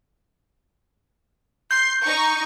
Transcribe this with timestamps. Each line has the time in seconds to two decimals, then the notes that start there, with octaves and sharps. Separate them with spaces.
1.71 C6 G6
2.04 D#4 C#6